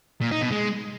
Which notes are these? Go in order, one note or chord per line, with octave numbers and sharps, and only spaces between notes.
A#2
D#4
B2
G#3